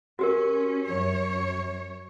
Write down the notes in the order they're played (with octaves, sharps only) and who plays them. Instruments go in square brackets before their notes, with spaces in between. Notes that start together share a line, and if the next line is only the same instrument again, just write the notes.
[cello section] C#4 [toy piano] F#4 G4 A#4
[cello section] F#2 C#5